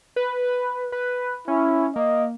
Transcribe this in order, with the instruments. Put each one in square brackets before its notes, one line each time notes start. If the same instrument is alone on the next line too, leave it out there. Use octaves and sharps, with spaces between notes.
[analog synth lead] B4
B4
[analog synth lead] C#4 [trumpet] E4
[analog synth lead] A#3 [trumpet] D#5